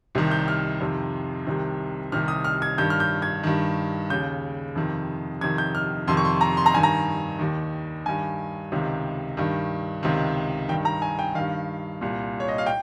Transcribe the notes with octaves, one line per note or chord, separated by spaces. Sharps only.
C2 C3 D#3
G6
F6
F2 C3 D#3
C2 C3 D#3
C2 C3 D#3 F6
D#6
F6
G#6
G2 D#3 G6
F6
G6
G#6
G2 D#3
D#2 C#3 G6
F2 C3 D#3
F2 C3 D#3 G#6
G6
F6
F2 C3 D#3 C6
C#6
C6
A#5
C6
A#5
G2 D#3 G#5
A#5
D#2 D#3
G2 D#3 G#5
C#2 C3 D#3
G2 D#3
C#2 C3 D#3
G2 D#3 G5
A#5
G#5
G5
G2 D#3 F5
C2 A#2
C#5
D#5
F5
G5